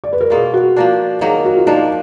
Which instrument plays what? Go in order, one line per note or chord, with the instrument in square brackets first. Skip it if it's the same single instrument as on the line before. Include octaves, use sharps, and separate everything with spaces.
[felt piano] D5
B4
A#4
[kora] B2 A#3 F4 [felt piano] G#4
[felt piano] F#4
[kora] F3 A#3 D4
[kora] D#3 F#3 A#3 [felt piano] G#4
[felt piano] F#4
F4
[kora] F3 A#3 D4 [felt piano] D#4